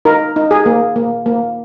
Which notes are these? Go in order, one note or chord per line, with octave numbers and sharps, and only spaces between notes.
D#4 A#4
D#4
G#4
A#3
A#3
A#3